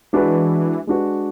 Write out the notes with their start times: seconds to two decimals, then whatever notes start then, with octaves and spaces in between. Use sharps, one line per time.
0.13 E3 G#3 D4 F#4 B4
0.87 G#3 D4 F#4 B4